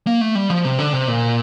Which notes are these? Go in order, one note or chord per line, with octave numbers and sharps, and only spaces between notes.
A#3
A3
G3
F3
C3
D3
C3
A#2